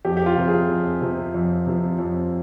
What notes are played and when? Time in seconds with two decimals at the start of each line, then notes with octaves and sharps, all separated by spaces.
0.05 F2 G4
0.17 G4
0.26 F4
0.37 C3 F3
0.48 G#4
0.69 F2
1.01 C3 F3
1.34 F2
1.67 C3 F3
1.99 F2